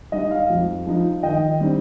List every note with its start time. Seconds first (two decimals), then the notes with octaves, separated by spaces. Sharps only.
0.12 G3 D#4 D#5
0.31 F5
0.50 F2
0.87 F3 D#4
1.23 D#3 D#5 G5
1.60 G3 C4 D#4